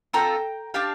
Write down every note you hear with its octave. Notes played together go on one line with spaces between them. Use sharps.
C4 F4 A4 G5 A#5
D4 G4 F5 A5